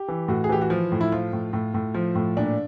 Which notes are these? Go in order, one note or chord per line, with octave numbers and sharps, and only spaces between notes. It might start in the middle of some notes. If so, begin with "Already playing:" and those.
Already playing: G4
E3
A2 F#4
G#4
E3 G4
F#4
F3 F4
A2
E4
F3 F4
A2
A2
A2
F3
A2
A#2 D4